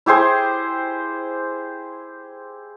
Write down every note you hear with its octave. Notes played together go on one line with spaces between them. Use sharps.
E4 G4 G#4 C5